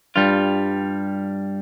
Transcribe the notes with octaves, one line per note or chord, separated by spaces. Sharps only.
G2 G3 F4